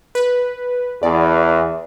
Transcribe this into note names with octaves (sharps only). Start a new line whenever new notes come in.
B4
E2 D5